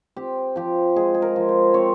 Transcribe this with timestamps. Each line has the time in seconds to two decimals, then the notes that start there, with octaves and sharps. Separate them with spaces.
0.16 C4 G4
0.56 F3 G4
0.96 G#3 G#4
1.14 G#4
1.22 A#4
1.36 F3
1.49 C5
1.74 C4 C#5